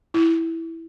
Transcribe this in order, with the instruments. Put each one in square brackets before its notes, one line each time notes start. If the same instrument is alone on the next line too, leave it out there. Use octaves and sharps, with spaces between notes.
[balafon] E4